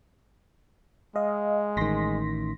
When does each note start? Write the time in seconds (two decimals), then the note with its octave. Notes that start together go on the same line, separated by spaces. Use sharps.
1.16 G#3 D#5 F5
1.77 A1 D#3 C6 A#6 B6